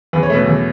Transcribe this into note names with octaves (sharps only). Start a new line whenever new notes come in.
E2 B4
C#5
B2 A3 B4
E2